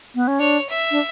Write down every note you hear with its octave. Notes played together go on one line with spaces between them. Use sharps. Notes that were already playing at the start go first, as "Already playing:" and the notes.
B3
C#4
D4 C#5
E5
D4